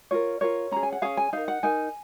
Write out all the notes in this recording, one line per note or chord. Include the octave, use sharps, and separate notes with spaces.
F4 A#4 C#5
F4 A#4 C#5
C#4 G#4 A#5
G#5
F#5
C#4 G#4 F5
G#5
D#4 A#4 F5
F#5
D#4 A#4 G#5